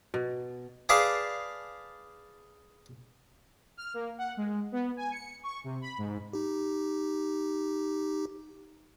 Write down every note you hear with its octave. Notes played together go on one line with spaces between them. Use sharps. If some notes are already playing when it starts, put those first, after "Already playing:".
B2
G#4 B4 D5 F5 A5
F6
A#3
F#5
G#3
B3
G#5
C#7
C#6
C3
B5
G#2
D#4 G4